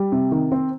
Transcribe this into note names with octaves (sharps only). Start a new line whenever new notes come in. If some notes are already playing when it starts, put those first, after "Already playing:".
Already playing: G3
C3
D#3
C4